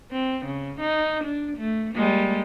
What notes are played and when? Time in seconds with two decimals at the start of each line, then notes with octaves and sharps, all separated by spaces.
0.12 C4
0.46 C#3
0.80 D#4
1.24 D4
1.58 A3
1.94 G3 G#3 A#3